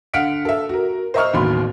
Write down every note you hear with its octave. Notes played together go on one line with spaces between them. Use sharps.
D3 F5 F#5 F6 B6 D7
A4 E5
F#4 A#4
C5 D#5 E5 A#5 C#6 F6
D1 A1 D#2 B2 B5 C6